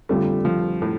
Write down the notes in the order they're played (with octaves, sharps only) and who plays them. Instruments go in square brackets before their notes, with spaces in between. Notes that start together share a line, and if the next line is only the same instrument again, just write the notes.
[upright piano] F2 D3 G3 F4 A4 [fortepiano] A3
[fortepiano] F3
A2